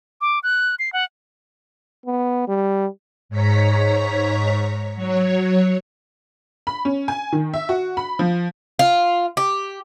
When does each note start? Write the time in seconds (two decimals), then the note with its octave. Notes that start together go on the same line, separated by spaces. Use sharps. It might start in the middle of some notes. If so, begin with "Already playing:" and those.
0.21 D6
0.43 F#6
0.79 C7
0.93 F#5
2.06 B3
2.48 G3
3.29 G#2 C#5 A#5 B6
4.95 F#3 C#5
6.67 B5
6.85 C#4
7.08 G#5
7.32 D#3
7.54 E5
7.69 F#4
7.97 B5
8.19 F3
8.79 F4
9.37 G4